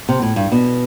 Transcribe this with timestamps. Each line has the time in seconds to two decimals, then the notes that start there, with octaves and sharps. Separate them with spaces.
0.09 C3
0.22 A2
0.36 G2
0.52 B2